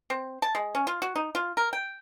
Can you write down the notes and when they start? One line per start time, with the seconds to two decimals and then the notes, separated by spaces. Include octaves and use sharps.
0.10 C4
0.42 A5
0.55 G#3
0.75 C#4
0.87 F4
1.02 F#4
1.16 D#4
1.35 F4
1.57 A#4
1.73 G5